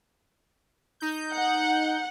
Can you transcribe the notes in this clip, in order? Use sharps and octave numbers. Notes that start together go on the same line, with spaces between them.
D#4 G6
F#5